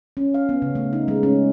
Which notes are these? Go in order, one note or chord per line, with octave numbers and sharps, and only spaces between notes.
C#4
F5
B3
C#3
A3
D#4
G#3
C#4